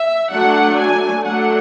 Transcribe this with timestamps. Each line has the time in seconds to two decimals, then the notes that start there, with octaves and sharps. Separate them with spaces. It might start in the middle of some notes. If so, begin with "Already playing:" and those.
Already playing: E5
0.30 F#3 A3 D4 F#5
0.78 G#5
1.25 F#3 A3 D4 F#5